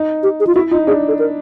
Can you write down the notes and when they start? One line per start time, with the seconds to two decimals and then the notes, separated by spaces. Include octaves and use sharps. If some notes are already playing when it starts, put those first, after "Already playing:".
Already playing: D#4
0.23 G4
0.40 G#4
0.47 F4
0.55 E4 F#4
0.71 D#4 F4
0.87 D4 G#4
1.08 A4
1.19 A#4